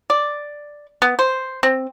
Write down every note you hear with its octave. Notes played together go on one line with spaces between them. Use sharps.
D5
B3
C5
C4